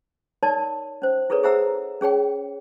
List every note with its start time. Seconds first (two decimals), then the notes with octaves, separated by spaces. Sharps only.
0.43 D#4 A#4 C#5 D5 A5
1.02 C#4 C5
1.30 E4 G#4 A4 B4 C#5
1.43 G#4 C5 E5 F#5 A#5 E6
2.01 C#4 G#4 C#5 G5